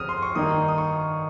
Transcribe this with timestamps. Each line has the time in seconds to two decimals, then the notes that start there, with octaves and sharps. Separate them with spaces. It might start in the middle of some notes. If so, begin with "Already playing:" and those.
Already playing: G1 F2 C#3 C4 D#6 F6
0.09 C6
0.22 C#6
0.35 G2 D#3 A#3 D#4 D#6
0.68 D#6
0.78 C#6